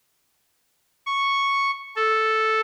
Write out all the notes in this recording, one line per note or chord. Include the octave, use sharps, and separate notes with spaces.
C#6
A4